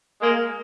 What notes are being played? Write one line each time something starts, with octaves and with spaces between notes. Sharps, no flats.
G#3 A#3